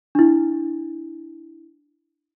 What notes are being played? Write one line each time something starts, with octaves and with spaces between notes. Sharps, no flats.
D4 E4